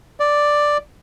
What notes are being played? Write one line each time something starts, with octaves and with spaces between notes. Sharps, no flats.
D5